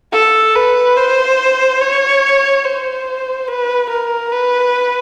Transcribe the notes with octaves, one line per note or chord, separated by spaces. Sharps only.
A4
B4
C5
C#5
C5
B4
A#4
B4